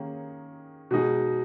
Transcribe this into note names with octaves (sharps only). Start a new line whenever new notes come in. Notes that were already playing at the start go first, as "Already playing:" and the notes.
Already playing: D#3 A#3 C#4 G#4
B2 G#3 D#4 G#4